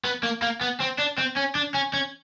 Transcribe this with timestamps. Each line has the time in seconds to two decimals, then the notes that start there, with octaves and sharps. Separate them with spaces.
0.04 B3
0.23 A#3
0.42 A#3
0.61 B3
0.80 C4
0.98 D4
1.18 C4
1.36 C#4
1.55 D4
1.74 C#4
1.93 C#4